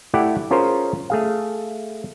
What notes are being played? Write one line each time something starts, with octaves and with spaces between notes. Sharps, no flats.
A3 E4 G4 D5 F#5
C#4 F4 G#4 A#4 C5 C#5
A3 G#4 F5